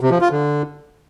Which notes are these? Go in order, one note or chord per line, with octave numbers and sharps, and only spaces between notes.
C3
F3
F4
D3